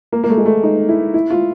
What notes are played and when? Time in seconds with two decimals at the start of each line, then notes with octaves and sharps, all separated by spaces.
0.12 A#3
0.24 A#3
0.29 A3
0.38 G#3
0.46 A3
0.63 D#4
0.89 E4
1.14 E4
1.30 F4